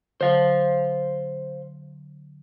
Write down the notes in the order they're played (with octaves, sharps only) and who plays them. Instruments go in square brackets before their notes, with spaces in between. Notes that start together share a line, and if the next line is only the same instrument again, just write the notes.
[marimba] D3 F#3 [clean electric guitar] C5 F5